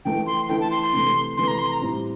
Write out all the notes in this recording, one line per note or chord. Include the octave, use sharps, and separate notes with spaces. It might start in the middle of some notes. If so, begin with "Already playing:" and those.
E3 A3 E4 A4 G5
C6
E3 A3 E4 A4 G5
A5
C6
C6
C3 E3 A3
C3 E3 A3 C6
A#5
C6
A#5
A2 G3 C4 E4